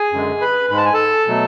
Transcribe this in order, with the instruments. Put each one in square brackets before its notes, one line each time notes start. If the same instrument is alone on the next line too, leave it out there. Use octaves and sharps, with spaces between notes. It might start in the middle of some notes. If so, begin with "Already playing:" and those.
Already playing: [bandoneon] G#4 G#5
F#2 D3 G#3
B4 B5
G#2 G#3 B5
A5
G#5
A4 A5
B2 F#3 A3